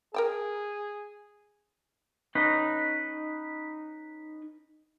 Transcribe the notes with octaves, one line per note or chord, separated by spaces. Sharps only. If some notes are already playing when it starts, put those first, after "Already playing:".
G#4 A#4 G5 A5
C#4 D#4 B4